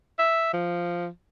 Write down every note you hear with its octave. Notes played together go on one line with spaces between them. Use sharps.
E5
F3